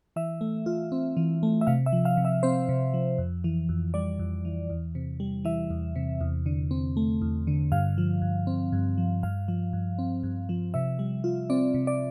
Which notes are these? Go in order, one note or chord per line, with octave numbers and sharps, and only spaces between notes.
E3 E5
A3
F4
C4
E3
A3
E5
C3 F5
E5
F3
F5
C3
E5
C4 C5
C3
F3
F2
E3
F2
G3 D5
F2
E3
E2
C3
G3
E3 E5
E2
C3
E2
D3
C4
A3
E2
D3
G2 F5
F3
G2
C4
G2
F3
G2 F5
F3
G2
C4
G2
F3
C3 E5
G3
F4
C4 D5
C3
D5